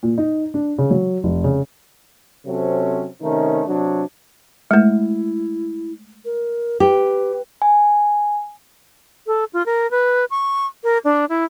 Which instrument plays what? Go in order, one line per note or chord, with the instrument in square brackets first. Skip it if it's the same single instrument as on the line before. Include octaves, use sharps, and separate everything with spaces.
[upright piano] A#2
D#4
D4
C#3
F#3
F1
C#3
[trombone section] C3 F#3 C4 C#4 A4
C3 D#3 A3 C#4 D#4
C3 F#3 D4
[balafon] G#3 A3 [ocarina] E4
[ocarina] A#4
[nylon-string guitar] G4 [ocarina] B4
[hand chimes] G#5
[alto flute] A4
F4
A#4
B4
C#6
A#4
D4
E4